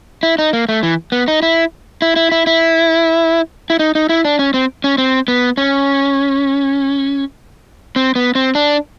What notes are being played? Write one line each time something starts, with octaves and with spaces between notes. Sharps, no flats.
E4
D#4
A#3
A3
E3
B3
D#4
E4
E4
E4
E4
E4
E4
D#4
D#4
E4
D4
C#4
C4
C#4
C4
B3
C#4
C4
B3
C4
D4